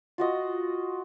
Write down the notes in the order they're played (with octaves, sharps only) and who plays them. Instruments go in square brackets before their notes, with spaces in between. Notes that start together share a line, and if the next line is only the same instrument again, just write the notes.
[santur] F4 F#4 D#5